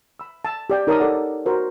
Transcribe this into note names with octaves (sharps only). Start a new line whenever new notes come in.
B5 E6
A5 E6
G4 D5 G5
D#4 A#4 C#5 D5 A5 D#6
A4 D5 F#5
F#4 A#4 C5